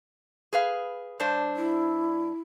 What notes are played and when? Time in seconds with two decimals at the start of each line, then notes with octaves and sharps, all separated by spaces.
0.53 G#4 B4 F5
1.20 G2 D4 C5
1.56 E4